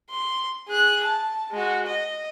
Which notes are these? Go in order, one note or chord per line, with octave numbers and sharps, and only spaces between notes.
C6
G#4 F#6
A5
G#3 F#4
D#5